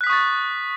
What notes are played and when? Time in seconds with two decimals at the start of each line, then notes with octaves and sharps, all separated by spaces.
0.01 F#6
0.04 B6
0.07 D#6
0.10 C#6
0.13 A6